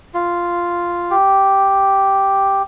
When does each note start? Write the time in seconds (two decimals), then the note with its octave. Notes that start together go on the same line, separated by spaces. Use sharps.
0.14 F4
1.11 G4